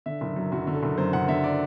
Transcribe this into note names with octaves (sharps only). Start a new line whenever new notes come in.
D3 E5
F#1
F#2
F#1 F#4
D3
A4
F#1
F#2 C5
F#1 F#5
D3 E5
D5